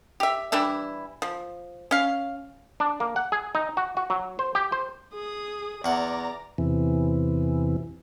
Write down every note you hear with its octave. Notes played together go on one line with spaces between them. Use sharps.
G4 E5
E3 G3 D4 E4
F3
C#4 F5
D4
A#3
F#5
G#4
D#4
F#4
F#4
F#3
C5
G4
C5
G#4 D#6
E2 D5 F#5 A#5
E2 C3 E3